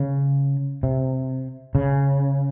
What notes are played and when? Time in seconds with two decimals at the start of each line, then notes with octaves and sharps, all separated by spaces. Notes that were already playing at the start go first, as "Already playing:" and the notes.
Already playing: C#3
0.83 C3
1.75 C#3